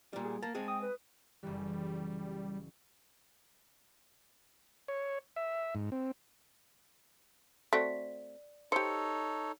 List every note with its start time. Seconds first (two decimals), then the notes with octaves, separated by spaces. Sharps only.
0.13 A#2 G3
0.25 G#4
0.43 A#3 A5
0.55 G#3 C4 G#4
0.68 G5 D#6
0.81 B4
1.43 F#1 E3 G3
4.88 C#5
5.36 E5
5.75 G#2
5.92 C4
7.73 A3 C4 F#4 D5 B6
8.72 D#4 G4 A4 C5 C#5 E6 C#7